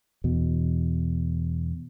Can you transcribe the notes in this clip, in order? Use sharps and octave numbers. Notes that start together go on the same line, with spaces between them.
E2 B2